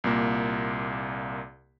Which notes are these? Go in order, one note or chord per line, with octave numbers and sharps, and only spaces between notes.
C2 A#2 A#3